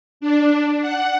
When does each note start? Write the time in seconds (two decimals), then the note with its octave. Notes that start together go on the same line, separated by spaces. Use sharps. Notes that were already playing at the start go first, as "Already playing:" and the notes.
0.21 D4
0.82 F#5